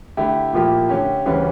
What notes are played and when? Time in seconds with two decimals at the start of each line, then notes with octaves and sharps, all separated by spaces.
0.17 D3 A3 E4 G4
0.53 A#2 F3 A#3 E4 G4
0.89 D3 A3 C#4 G4
1.26 D2 C#3 E3 G3 C#4